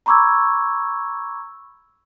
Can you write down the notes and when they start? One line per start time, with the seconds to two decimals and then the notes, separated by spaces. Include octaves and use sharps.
0.06 A#5 B5 C#6 D6 E6 G#6